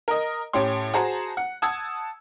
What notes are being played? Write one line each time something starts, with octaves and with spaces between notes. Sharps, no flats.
A#4 D#5
A2 C#4 G4 C#5 C6
F#4 G#4 C5 A5 A#5
F#5
F#5 A5 D#6 E6 G#6